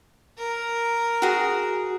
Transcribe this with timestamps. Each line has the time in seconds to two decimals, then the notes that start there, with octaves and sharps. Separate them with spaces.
0.38 A#4
1.22 F#4 G#4